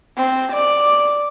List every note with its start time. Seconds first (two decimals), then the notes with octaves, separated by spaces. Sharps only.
0.18 C4
0.52 D5